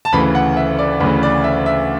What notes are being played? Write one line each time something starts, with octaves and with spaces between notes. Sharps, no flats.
A5
D2 C#3 E3 B5
F#5
E5
D5
D2 C#3 E3 B4
D5
E5
E5